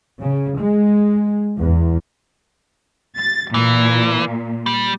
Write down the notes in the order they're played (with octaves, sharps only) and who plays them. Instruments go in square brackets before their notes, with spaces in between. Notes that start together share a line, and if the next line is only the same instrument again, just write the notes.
[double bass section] C#3
G#3
E2
[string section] A6
[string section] A#2 [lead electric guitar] E3
[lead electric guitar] G3